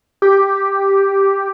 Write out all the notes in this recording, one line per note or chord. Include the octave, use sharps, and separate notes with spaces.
G4